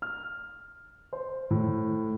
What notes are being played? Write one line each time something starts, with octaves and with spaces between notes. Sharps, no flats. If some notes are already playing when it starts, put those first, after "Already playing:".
F6
C5
A2